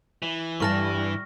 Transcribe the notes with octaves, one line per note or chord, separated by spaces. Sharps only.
E3
G2 G3 A#4 A5 C#6 F6 A#6